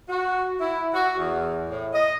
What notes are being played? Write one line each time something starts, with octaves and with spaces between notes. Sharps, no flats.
F#4
E4
F#4
E2
A2
D#5